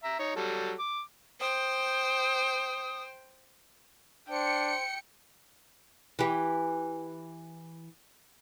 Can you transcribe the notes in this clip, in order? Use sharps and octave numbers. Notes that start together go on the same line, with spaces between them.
E5 A#5
D#4 C#5
F#3 G3 A4
D6
C5 G5 D#6
D4 C5 G5 C#7
E3 G4